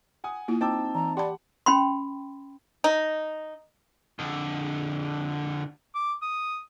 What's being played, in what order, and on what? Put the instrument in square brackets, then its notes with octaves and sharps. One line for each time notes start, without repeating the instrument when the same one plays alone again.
[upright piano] F#5 G#5 D#6
[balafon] A#3 E4 F4
[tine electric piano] C4 D#4 A5 [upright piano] G5 D6 E6
[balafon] E3 [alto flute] A#5
[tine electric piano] G4 [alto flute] D5 [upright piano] F#5 [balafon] A5 B5 C6
[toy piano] C#4 G5 B5 C6
[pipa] D#4
[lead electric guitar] F2 D3
[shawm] D6
D#6